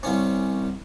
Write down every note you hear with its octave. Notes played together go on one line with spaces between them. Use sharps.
C2 C#4